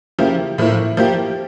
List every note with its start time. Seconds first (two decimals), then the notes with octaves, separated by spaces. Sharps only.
0.19 C#3 F3 A#3 E4 G4
0.58 A2 F3 A#3 E4
0.97 F3 A#3 E4 G4